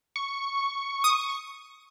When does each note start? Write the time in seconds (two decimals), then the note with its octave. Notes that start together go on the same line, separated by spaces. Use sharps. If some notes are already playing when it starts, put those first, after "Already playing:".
0.16 C#6
1.04 D#6